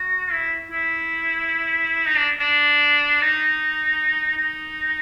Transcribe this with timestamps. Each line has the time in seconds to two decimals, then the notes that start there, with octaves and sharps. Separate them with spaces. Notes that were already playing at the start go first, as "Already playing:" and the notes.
Already playing: F#4
0.32 E4
0.71 E4
2.06 D#4
2.17 D4
2.40 D4
3.21 D#4
4.37 D#4